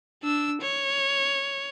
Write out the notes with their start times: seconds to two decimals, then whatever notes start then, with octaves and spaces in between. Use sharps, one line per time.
0.23 D4 E6
0.61 C#5